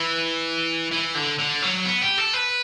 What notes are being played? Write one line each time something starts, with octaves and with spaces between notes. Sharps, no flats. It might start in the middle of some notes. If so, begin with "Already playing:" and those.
Already playing: E3
E3
D3
D3
F#3
B3
G4
A4
B4